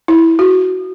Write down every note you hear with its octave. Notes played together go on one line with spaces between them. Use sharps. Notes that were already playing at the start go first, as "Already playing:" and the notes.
E4
F#4